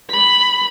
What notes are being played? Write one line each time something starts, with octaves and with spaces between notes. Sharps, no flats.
B5